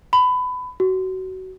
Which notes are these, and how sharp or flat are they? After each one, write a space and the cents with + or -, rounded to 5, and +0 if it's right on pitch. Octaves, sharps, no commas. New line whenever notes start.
B5 +25
F#4 +20